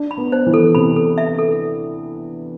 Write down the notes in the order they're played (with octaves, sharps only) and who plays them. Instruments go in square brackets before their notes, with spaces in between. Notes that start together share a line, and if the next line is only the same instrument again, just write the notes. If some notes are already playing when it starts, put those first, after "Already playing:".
Already playing: [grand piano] D4
[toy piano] B5
[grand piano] B3
[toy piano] C5
[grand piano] E3
[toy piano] A4
[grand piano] C3 [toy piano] B5
[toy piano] A4
E5
A4